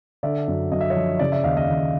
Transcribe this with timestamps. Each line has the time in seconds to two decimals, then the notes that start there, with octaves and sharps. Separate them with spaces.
0.23 D3 D5 E5
0.48 F#2
0.72 F#2 D#5
0.81 E5
0.90 C#5 D#5
0.96 F3
1.19 C#3 D5
1.32 D5 E5
1.44 D#2 D#5 F5
1.56 D#5 F5
1.68 D#2